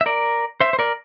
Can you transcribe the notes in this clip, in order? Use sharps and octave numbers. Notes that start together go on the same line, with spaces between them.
E5
A#4 D5
C5 E5
C5
A#4 D5